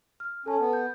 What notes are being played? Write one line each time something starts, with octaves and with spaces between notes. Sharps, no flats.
F6
C#4 A4 A5
B3
G6